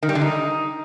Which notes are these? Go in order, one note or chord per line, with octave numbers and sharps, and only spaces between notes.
D#3
G3
D3
D#4